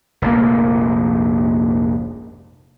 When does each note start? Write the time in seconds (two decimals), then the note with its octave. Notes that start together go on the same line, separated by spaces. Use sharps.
0.22 F1 A#1 G#2 A#3